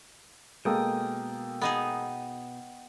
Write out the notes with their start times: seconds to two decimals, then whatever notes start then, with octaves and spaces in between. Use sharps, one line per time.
0.65 B2 G#3 A#3 A4 G5 D#6 G6
1.61 B3 D#4 G#4